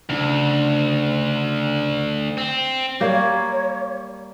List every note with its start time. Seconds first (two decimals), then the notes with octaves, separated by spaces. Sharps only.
0.10 D2 C#3 D4
2.38 C4
3.00 G3 A#3 C#5